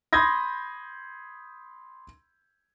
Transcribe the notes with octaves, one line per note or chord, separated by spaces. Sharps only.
B5 C6 D#6 G6 G#6 A#6